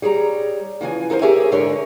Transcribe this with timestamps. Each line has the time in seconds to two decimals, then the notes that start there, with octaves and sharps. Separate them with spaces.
0.02 G3 G#4 C#5 A#5
0.81 C#3 E3 F3 G#5
1.10 D#4 A4 A#4 C5
1.22 G4 G#4 A#4 C#5 E5 G#5
1.52 G#2 D3 D4 A#4 C#5